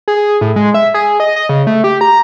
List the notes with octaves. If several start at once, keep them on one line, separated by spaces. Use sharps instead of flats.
G#4
A2
G#3
E5
G#4
D#5
D#5
C#3
A3
G4
A#5